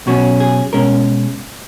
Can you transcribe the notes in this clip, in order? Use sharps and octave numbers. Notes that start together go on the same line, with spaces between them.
B2 F#3 C#4 F#4
G#4
B2 G#3 C#4 A#4